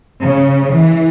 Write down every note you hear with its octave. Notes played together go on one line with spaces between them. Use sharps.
C#3
E3